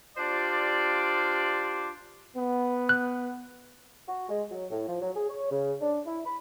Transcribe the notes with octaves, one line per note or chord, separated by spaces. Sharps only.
D4 F4 G4 C5 D5
B3
F#6
F#4
G#3
F#3
A2
F3
F#3
G#4
C#5
C#3
D4
E4
B5